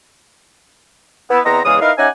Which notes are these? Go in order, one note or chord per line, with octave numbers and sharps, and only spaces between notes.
B3 E4
E2 B3 C4 D#5 A#5
E2 C#3 E3 G#3 F5 D#6
D#4 E4 A#4 B4 D#5 F5
C#4 D#4 G4 E5 F#5 G#5